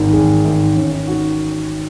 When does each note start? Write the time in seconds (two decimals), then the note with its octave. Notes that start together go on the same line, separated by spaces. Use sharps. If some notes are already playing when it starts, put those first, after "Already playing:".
Already playing: G#1 G#2 D#3 D#4
0.13 G#1 G#4
0.44 G#2 D#3 D#4
0.76 G#1 C#4
0.92 D#4
1.07 D#3 F#4